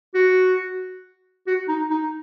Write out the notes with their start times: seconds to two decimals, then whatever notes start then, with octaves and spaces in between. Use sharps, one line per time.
0.15 F#4
1.47 F#4
1.68 D#4
1.91 D#4